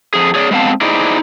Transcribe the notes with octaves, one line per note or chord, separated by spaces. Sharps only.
F2 G#4
G#4 C#5 D5
G#3 B3 C4 F5 A5
D#4 E4 G#4 C5 D5 D#5